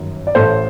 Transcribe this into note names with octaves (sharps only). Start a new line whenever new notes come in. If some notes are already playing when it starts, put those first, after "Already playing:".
Already playing: G1 F#2 D#3
D5
A1 A2 A4 C5